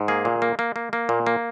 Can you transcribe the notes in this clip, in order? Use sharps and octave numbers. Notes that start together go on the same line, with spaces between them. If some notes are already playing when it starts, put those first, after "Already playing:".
Already playing: G#2
A#3 G#4
A#2
A#3
A#3
A#3
A#3
A#2
A#3